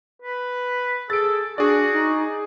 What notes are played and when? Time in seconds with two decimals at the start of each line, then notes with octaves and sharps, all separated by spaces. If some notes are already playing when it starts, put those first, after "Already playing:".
0.22 B4
1.10 G#4 A4 A6 D7
1.58 D4 F#4 G#4 D5
1.92 D#4